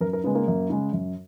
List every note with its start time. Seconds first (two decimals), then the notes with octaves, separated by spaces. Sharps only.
0.01 F#2 A#4
0.13 A#4
0.24 C#3 G#3 B3
0.35 A#3
0.48 F#2
0.70 C#3 G#3
0.93 F#2